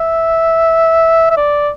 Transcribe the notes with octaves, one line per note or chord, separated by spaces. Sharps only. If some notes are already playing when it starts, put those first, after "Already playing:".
Already playing: E5
E5
D5